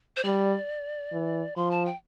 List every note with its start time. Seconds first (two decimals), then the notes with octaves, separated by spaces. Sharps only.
0.17 C5
0.24 G3 D5
1.12 E3
1.56 F3 C6
1.71 A5
1.86 G5